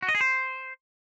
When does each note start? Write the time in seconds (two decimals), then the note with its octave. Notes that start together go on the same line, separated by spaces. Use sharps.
0.02 F#4
0.09 D#5
0.15 G#4
0.21 C5